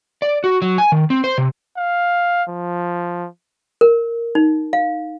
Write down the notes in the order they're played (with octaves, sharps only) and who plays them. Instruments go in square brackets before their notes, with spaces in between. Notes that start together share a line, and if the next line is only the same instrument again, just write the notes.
[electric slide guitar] D5
F#4
F#3
G#5
D#3
C4
C5
C3
[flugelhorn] F5
F3
[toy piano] A#4
D#4
F5